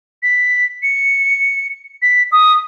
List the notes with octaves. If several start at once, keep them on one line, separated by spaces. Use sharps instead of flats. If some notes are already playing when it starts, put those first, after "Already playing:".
B6
C#7
B6
D#6